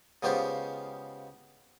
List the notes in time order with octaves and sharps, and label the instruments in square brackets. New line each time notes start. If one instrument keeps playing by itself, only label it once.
[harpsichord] C#3 G#3 B3 F4 G4 C5